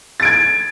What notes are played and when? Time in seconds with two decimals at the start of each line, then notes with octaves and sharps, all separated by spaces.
0.20 A6
0.22 D7
0.25 G#6